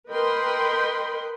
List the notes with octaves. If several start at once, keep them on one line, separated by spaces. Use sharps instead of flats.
A#4 B4 D#5 G5 B5 C6